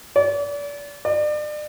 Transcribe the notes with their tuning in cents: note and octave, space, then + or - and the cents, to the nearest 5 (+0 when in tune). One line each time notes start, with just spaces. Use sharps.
D5 -35
D5 +35